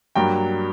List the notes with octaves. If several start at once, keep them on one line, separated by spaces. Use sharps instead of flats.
G2 F#3 A#3 G5